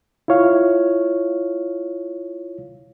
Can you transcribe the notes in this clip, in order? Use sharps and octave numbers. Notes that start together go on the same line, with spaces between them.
E4 F4 C#5 F5